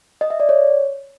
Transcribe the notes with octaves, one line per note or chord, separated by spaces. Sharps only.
D#5
E5
D5
C#5